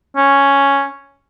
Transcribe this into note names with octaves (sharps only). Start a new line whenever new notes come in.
C#4